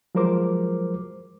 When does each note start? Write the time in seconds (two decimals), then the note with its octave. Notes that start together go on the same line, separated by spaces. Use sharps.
0.15 F3 F#3 G#3 A#4 C5 D6